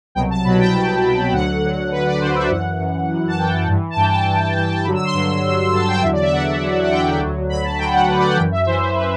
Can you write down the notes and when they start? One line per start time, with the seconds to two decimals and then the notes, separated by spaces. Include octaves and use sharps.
0.15 C2 B2 F#3 G5
0.30 A5
0.45 C2 B2 F#3 B5
0.59 G5
0.74 C2 B2 F#3
1.04 C2 B2 F#3
1.33 D2 D3 F#3 F#5
1.62 D2 D3 F#3
1.91 D2 D3 F#3 B4
2.06 D5
2.20 D2 D3 F#3 C5
2.35 E5
2.50 F#2 E3 F#5
2.80 F#2 E3
3.09 F#2 E3
3.28 A5
3.38 F#2 E3 G5
3.67 G2 E3
3.90 A5
3.96 G2 G5
4.01 E3
4.11 A5
4.26 G2 E3
4.55 G2 E3
4.84 G2 D3 F#3 B5
4.94 E6
5.04 C6
5.13 G2 D3 F#3
5.43 G2 D3 F#3
5.73 G2 D3 F#3 A5
5.88 G5
6.02 E2 D3 F#3 E5
6.12 D5
6.22 E5
6.32 E2 D3 F#3 F#5
6.60 E2 D3 F#3
6.83 F#5
6.91 E2 D3 F#3 G5
7.20 D2 D3 F#3
7.49 D2 D3 F#3 B5
7.64 A5
7.78 D2 D3 F#3 G5
7.93 F#5
8.08 D2 D3 F#3 B4
8.17 D5
8.27 F#5
8.36 F#2 E3 G5
8.52 E5
8.66 F#2 E3 C5
8.81 C5
8.96 B4
8.99 E3